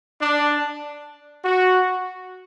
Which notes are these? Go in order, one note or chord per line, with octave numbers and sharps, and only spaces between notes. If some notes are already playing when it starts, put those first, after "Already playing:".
D4
F#4